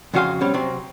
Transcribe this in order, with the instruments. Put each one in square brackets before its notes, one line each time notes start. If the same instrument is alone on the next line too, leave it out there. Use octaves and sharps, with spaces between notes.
[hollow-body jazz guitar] F2 C#3 F#4 F5 G#5 C6
B2 G3 C4 C#4
C3 F#3 C4